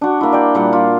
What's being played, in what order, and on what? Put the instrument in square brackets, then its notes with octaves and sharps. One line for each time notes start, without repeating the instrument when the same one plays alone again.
[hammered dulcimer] D4 F#4
A#3 E4
D5 G5
A#2 G3 F#5
F4